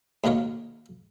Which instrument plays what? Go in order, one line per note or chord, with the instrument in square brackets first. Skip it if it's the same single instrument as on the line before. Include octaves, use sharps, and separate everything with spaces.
[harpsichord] D#2 B2 A#3 A#4 C#5